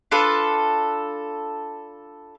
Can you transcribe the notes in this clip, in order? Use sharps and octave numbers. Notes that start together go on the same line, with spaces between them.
D4 F4 A4 B4